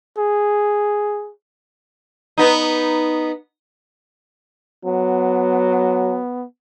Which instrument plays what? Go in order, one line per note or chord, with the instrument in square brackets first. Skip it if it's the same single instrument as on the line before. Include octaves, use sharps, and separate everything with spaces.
[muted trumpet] G#4
[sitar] B3 D#4
[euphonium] F#3 [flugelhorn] B3